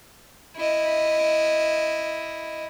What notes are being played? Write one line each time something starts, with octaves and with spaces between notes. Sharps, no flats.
E4 D#5